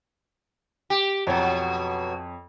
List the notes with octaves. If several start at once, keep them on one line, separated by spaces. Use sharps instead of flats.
G4
F2 B2 F#3 C#5